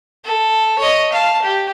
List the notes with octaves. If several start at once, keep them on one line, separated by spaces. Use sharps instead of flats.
A4
C#5 D#5
F5 A5
G4